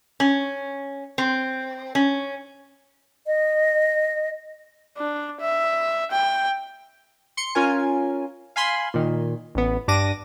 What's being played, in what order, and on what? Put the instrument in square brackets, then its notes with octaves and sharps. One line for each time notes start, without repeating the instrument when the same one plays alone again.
[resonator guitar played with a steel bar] C#4
C4
C#4
[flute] D#5
[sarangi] D4
E5
G5
[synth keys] C6 C#7
C#4 F4 A#4 G#5
F5 G#5 B5 C6
A#2 D#3
A1 B3
G2 D4 D6 A#6 D#7